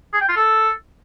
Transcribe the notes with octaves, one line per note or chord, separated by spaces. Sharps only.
G#4
G5
F4
A4